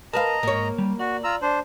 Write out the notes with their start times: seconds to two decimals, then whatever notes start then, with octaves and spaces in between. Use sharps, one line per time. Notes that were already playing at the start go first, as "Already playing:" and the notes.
0.14 A#4 B4 D#5 F5 A5 A#5
0.43 G#2 A#3 C#5
0.78 G3
0.99 F#4 D5
1.24 F4 A#5 E6
1.42 D4 C5